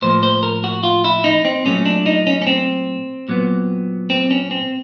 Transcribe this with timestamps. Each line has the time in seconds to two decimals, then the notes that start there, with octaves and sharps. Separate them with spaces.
0.02 A2 F3 A#3 C5
0.23 C5
0.43 A#4
0.64 F#4
0.83 F4
1.04 E4
1.24 D#4
1.45 C4
1.65 A#2 F#3 A3 C#4
1.86 D4
2.06 D#4
2.27 C#4
2.42 C#4
2.47 C4
3.29 A#2 F#3 B3
4.10 C4
4.31 C#4
4.51 C4